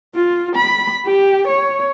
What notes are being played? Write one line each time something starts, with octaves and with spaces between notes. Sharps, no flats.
F4
B5
G4
C#5